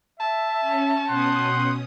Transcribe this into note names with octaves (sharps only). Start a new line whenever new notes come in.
E5 A5
C#4
B2 C#4 F#5 G5 C6 D#6